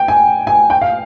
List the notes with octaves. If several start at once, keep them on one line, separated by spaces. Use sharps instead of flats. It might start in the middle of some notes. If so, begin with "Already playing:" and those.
Already playing: G5
G#5
G#5
G5
F5